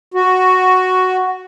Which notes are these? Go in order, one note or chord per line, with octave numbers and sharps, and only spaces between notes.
F#4